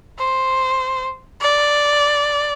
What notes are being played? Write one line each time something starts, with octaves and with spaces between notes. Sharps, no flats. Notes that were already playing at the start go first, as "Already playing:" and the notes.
C5
D5